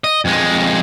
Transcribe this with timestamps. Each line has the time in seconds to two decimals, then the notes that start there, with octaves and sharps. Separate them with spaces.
0.04 D#5
0.25 F2 G#3